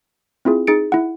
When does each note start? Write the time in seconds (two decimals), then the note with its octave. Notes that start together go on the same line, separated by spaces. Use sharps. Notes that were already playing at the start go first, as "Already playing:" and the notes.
0.45 C4 E4 F4 G#4
0.67 D#4 G#4 A6 C#7 D7
0.92 E4 F#5